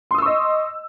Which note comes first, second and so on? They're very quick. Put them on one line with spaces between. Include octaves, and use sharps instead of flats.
C6 D#6 E6 C#6 D#5